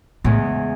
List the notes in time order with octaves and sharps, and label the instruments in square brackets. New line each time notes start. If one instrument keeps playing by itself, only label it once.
[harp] E2 C#3 G#3 [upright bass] A2